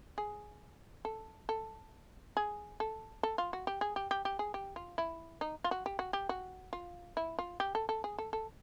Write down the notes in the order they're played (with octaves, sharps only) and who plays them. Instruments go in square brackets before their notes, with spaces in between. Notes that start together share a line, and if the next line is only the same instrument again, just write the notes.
[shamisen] G#4
A4
A4
G#4
A4
A4
F4
F#4
G4
G#4
G4
G4
G4
G#4
G4
F4
E4
D#4
F4
F#4
G4
F#4
G4
F#4
F4
E4
F4
G4
A4
A4
G#4
A4
A4